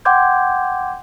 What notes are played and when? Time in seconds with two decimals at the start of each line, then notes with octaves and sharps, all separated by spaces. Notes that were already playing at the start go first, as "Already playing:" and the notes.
0.05 F#5 G5 C6 D6 G6 G#6